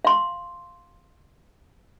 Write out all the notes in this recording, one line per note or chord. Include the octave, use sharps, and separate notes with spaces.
F5 C6